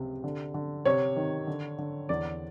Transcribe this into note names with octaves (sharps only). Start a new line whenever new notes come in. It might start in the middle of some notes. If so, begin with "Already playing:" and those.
Already playing: C#2 C3
D3
D3
C3 C#5
D#3
D3
D3
E2 D5